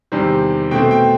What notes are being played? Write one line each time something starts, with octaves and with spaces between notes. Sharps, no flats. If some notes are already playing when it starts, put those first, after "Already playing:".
E2 C3 D#3 G3 C4
B2 A3 C4 G5
G5